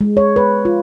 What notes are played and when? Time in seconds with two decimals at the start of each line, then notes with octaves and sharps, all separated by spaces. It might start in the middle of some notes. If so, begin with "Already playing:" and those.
0.01 G#3
0.17 C#5
0.36 B4
0.65 F4